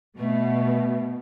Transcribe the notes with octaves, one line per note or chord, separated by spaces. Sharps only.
B2 A3